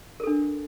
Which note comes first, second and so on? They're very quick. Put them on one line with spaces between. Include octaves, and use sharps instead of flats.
A#4 A4 D4